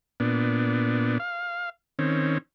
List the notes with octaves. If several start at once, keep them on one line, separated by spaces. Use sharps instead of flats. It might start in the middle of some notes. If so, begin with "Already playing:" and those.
A#2 B3 D4
F5
D#3 C4 C#4